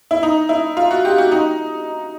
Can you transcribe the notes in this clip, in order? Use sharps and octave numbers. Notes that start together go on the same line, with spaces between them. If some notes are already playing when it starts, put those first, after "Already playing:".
E4
D#4
E4
F4
F#4
G4
F#4
D#4